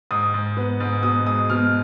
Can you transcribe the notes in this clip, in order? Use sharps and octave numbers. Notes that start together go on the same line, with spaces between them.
G#2 D#6
G#2
B3
G#2
B2 D#6
G#3 D#6
B2 F6